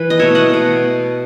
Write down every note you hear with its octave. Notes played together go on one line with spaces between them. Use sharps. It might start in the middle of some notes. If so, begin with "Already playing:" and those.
Already playing: E3 B4
D#5
B2 A3 C#5 E5
D#5 F#5
B2 A3